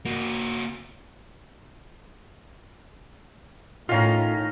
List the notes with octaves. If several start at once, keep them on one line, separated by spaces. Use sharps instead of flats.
A#3 F#4
A2 D#3 C#4 F4 F5 A#5